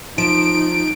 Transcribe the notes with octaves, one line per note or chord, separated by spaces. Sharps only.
F3 D#4 D7